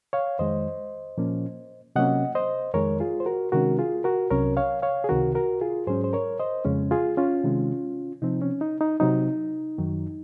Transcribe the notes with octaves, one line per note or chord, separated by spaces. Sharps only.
C#5 F5
F2 D#3 G#3 C5 D#5
A#2 F3 A#3 C#4
C3 F#3 A#3 C#4 D#5 F#5
C5 D#5
F2 D#3 G#3 A#4 C#5
F4 G#4
C5
F#4 A#4
C3 D#3 G#3 C#4 F#4 A#4
F4 G#4
F#4 A#4
C2 C3 F#3 C#4 A#4 C#5
C#5 F5
C#5 F5
G#4
C#2 C3 D#3 F#4 A#4
F#4 A#4
F4 G#4
G#2 F#3 C#4 G#4 C5
C5
A#4 C#5
C5 D#5
F2 C#3 G#3 C#4
F4 G#4
C#4 F4
C3 D#3 G#3
C3 F3 C4 D#4
C#4
D#4
D#4
C3 F#3 C4 D#4
F#2 D#3 F#3